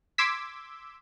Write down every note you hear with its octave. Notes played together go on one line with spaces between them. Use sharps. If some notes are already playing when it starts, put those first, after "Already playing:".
C6 D6 E6 G#6 B6